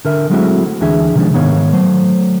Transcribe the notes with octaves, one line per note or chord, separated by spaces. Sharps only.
D3 A#4 E5
F#3 G#3 A3 C4 E4 F#4
D2 E3 D4 G#4 E5
C3 D#3 F3 G3 G#3 D4
G#2 D#3 B3 C#5 F5
F#3 A3 C5